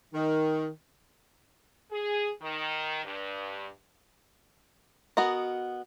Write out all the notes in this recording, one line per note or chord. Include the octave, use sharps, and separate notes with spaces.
D#3
G#4
D#3
G2
B3 F#4 A#4 D#5